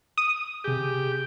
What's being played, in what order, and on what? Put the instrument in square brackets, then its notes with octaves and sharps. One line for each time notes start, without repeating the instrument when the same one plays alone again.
[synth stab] D#6
[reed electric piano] C3 G#4 [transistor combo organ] G4